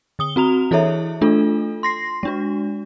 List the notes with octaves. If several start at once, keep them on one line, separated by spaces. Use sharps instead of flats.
D3 D#6 G7
C4 F#4 A#5 F7
E3 E4 G#4 A4 C#5 E5
A3 D4 F4 A4
C6 A#6 C7
G#3 D4 F#4